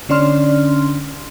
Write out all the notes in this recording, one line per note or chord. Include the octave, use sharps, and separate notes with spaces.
D3 C#4 D4 D5 C6 F6